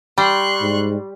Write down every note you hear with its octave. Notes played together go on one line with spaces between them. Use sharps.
G3 C6 C#6 F#6
G#2